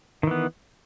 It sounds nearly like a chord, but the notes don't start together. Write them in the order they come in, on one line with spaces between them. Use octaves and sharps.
D#3 E3 B3